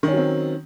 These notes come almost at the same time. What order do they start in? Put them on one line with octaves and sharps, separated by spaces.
D#3 C#4 F#3 C4